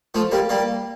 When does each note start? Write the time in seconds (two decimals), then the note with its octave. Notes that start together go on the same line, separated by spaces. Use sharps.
0.14 F3 A3
0.31 G3 A#3
0.49 G3 A#3